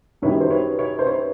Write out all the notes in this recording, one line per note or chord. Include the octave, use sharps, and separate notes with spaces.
F#2 D#3 G3 B4 C#5
C5
B4 C#5
B4 C#5
C5
B4 C#5